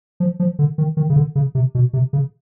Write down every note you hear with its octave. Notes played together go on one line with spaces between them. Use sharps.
F3
F3
D3
D#3
D#3
C#3
D3
C#3
C3
B2
C3
C#3